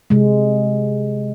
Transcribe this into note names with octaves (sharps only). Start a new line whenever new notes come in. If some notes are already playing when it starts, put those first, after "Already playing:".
C3 G#3